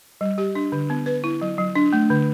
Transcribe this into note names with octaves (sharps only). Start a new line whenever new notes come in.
G3
G4
D4
D3
B3
B4
E4
F#3
F#3
D4
A3
D3